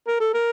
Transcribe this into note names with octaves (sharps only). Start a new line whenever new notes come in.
A#4
A4
A#4